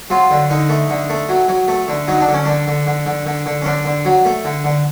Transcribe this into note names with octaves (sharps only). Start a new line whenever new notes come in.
F#3 F4
D3
D3 D#4
A3
D3
A3
F#3
F#3
A3
D3
F#3 D#4
D4
D3
C#4
D3 D4
D3
D3
D3
D3
D3
C#4
D3 D4
D3
F#3
A3
D3
D3